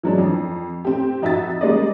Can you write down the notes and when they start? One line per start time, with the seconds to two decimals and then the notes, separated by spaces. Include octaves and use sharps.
0.03 E3 F#3 G#3 D4
0.18 F2
0.85 C4 G4
1.22 F2 D#4 F#4 E5 A6
1.61 G3 G#3 A#3 C#4 D5 D#5